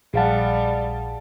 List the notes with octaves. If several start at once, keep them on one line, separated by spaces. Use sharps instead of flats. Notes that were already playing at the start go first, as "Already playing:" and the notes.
A#1 G3 G#4 F5 F#5 A5